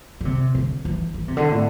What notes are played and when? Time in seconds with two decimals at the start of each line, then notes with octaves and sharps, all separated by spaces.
0.21 D3
0.25 C3
0.55 D3
0.85 E3
1.14 E3
1.28 C3
1.37 D3
1.52 A2